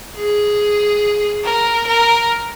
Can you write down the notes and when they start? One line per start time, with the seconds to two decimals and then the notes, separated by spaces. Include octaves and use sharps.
0.16 G#4
1.44 A#4
1.87 A#4